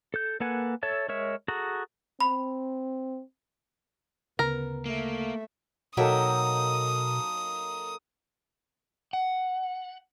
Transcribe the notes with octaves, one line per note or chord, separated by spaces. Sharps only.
A4 G6
A#3 A4 B4 F#5 G#5
A4 C#5 E5 A5
G#3 A#4 C#5 E5
F#4 G#4 A4 A#5
C4 B5
D2 C#3 B3 A#4
A3 A#3 E5
B2 F#3 A#3 D#4 A4 E5 G5 D#6
F#5